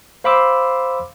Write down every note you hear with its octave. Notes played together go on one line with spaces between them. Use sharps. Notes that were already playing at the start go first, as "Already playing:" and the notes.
C5 F5 B5 C6 D6 E6